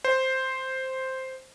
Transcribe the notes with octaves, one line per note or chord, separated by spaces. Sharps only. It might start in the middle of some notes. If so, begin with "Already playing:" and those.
C5